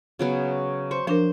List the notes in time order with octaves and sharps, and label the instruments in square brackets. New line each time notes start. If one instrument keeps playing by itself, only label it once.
[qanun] C#3 F#3 B3
C5 C#6
[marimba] F3 D4 A#4 [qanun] C5